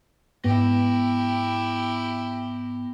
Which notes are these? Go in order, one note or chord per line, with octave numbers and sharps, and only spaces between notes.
G#2 B3 E4 G4 A#6